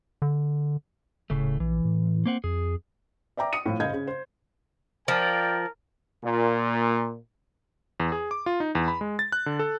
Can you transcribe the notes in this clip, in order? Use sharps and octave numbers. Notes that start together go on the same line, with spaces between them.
D3
D#1 A2 C#3 A3
A#1 E3
A2
A#3 C4 F#5
F2 G#4
D5 E5 G5 A#5 D6
D#6 C#7 D#7
A2 F3
F#1 D#5 F5 G6 G#6
C#3
C5
F3 A#4 D5 F5 G5
A#2
E2
G#4
D6
F4
D#4
E2
B5
G#3
A6
F#6
D3
A4